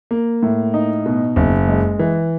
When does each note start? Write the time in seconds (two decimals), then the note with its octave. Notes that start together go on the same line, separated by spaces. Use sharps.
0.11 A#3
0.43 A2
0.74 D#4
1.06 B2
1.36 F#1
1.68 G#3
1.99 E3